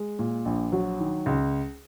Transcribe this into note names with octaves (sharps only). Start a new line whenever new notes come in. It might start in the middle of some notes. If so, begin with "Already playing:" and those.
Already playing: G#3
A#2
A#1
F#3
D#3
C#2